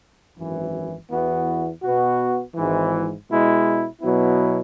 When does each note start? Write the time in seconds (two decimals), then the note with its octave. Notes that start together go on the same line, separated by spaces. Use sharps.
0.37 G#1 F#2 E3
1.10 E2 E3 B3 F#4
1.83 B2 B3 F#4
2.55 G#1 G#2 E3
3.28 B2 G#3 E4
4.01 B2 F#3 B3 E4